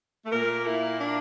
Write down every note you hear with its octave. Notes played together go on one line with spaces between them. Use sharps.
A3
A#2 A#3 A#4
E4
D4